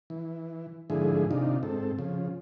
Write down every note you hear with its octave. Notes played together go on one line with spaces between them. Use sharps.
E3
G#2 D3 F3 A3 E4 G#4
C3 D#3 D4 D#4 F4
G#2 C4 A4
C#3 F3